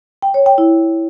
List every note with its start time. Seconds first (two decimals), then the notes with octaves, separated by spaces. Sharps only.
0.23 G5
0.34 C#5
0.46 G5
0.58 E4